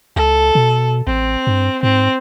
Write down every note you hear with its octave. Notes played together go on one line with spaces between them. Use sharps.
C#2 A4
B2
A1 C4
G2
G#2 C4